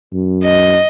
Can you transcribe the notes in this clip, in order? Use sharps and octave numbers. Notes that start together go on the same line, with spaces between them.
F#2
D#5